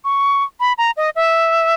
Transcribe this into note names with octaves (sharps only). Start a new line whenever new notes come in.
C#6
B5
A#5
D#5
E5